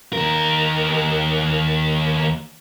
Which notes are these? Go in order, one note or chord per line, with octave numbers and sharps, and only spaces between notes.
D#2 A#4